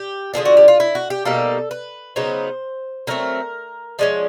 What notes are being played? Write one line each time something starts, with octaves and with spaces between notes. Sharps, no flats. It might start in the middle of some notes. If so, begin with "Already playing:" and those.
Already playing: G4
D3 F3 A3 D4 G#4
F#4
G4
F4
E4
F#4
G4
B2 G3 A#3 D#4 A4
B4
C#3 F#3 B3 D#4 C5
D3 F#3 A3 C4 A#4
F3 G#3 C#4 D5